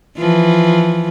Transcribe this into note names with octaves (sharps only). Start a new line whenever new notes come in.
E3 F3